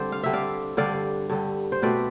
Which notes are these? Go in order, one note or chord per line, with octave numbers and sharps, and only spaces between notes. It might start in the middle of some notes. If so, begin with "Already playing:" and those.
Already playing: D3 G3 C4 C5 D5
F5
D3 G3 C4 E5
D5 F5
G2 D3 G3 D5 F5
G2 D3 G3
C5
B2 A3 C4 B4 D5